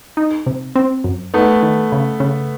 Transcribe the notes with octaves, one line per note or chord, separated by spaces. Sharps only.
D#4
C3
C4
F#2
A3 B3 D#4
D#3
C#3
C#3